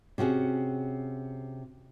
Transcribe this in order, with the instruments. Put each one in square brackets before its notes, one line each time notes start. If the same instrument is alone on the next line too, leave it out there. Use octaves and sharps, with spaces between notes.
[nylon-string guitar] C3 C#4 F#4 G#4